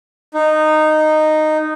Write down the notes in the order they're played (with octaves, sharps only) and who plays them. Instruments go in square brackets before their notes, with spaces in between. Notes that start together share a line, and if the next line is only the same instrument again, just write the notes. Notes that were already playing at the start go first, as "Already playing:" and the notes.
[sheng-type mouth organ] D#4